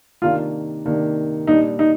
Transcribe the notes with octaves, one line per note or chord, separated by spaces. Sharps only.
C3 D#3 A#3 D4 F4
C3 D#3 A#3 D4
A#2 G3 D4 D#4
D#4